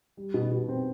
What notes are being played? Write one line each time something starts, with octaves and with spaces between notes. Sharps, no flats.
G3
B2
B2
C4